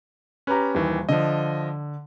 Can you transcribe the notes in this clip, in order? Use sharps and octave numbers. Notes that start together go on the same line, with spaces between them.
C#4 G4 B4 A#5
D#1 D#3 E3
D3 F3 D#5